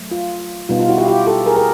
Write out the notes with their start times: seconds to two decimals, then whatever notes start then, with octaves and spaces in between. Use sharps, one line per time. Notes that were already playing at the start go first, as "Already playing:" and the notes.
Already playing: F#3 A3
0.11 F4
0.69 B2 G3 B3 D#4 F4
0.79 F4
0.88 E4 F#4
0.98 F4 G4
1.08 F4 G4
1.27 G4 A4
1.46 G#4 A#4
1.56 G#4 A#4